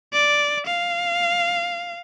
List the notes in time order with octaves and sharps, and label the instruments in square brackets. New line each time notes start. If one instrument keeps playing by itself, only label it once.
[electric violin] D5
F5